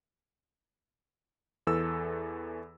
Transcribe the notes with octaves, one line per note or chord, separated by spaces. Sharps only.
E2 E3 A4 E6